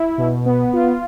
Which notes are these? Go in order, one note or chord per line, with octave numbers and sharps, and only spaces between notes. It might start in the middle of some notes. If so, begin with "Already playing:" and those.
Already playing: E4
B2
B3
F4